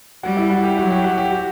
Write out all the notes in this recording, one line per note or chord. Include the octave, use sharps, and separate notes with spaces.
G3 F#4
E4
F#4
G4
F#3 F#4
G4
F#4
G4
F#4